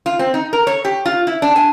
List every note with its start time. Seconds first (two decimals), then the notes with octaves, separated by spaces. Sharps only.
0.06 F4
0.19 C4
0.34 D#4
0.53 A#4
0.67 C#5
0.85 G4
1.05 F4
1.27 E4
1.42 D4
1.56 G#5